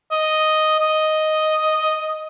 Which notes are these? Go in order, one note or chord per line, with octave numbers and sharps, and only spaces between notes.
D#5
D#5